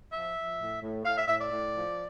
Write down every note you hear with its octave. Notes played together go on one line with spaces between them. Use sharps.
F3 E5
F3
A2
A2
A2 F5
E5
A2 E5
D5
A2
F3